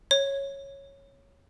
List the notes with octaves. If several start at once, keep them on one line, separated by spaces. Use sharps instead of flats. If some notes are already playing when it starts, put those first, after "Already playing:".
C#5